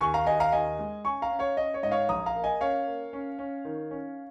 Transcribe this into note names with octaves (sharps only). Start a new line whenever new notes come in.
D#2 G#5 C#6
F5 A#5
D#2 D#5 G#5
F5 A#5
D#2 D#5 G#5
G#3
C#4 G#5 C#6
F5 A#5
C#4
C#5 F5
C#4 D#5
C#5
G#2 D#5
C#5 F5
A#1 A#5 D#6
F5 A#5
A#3
D#5 G#5
C#4 C#5 F5
A#3
C#4
C#4
D#3
C#4